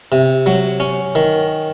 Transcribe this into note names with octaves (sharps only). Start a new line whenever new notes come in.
C3
F#3
C#4
D#3